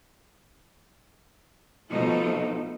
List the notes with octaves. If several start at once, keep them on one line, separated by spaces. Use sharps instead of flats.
B2 F3 A3 D#4 A4